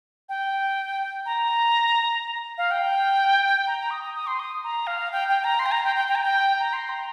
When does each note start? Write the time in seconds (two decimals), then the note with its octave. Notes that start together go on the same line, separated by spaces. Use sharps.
0.29 G5
1.26 A#5
2.58 F5
2.71 G5
3.67 A#5
3.79 A#5
3.91 D#6
4.03 D#6
4.15 D#6
4.27 C6
4.40 D#6
4.64 A#5
4.87 F5
5.12 G5
5.28 G5
5.44 A#5
5.59 C6
5.66 G5
5.72 A#5
5.84 G5
5.96 G5
6.08 G5
6.15 A#5
6.23 G5
6.60 A#5
6.73 C6
6.89 A#5